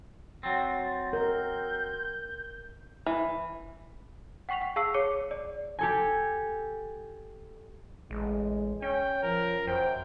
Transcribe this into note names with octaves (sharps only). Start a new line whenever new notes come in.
F#3 C4 A6
A#4 G6
E3
F#5 G5 C#6 B6 F7
F#5
G#4 F5 A5 C#6 E6 C7
G#4 C#5 D6 C#7
D5
G4 A4 G#5
A1 G#3
C#4 C#5 G5
F3 A#4
F#2 C5 G5